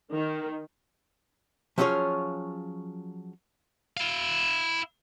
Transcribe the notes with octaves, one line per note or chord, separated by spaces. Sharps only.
D#3
F3 F#3 C#4 F4 G#4 C#5
E4 F5